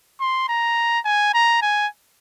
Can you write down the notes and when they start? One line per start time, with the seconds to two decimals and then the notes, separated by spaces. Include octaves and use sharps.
0.20 C6
0.49 A#5
1.05 G#5
1.34 A#5
1.62 G#5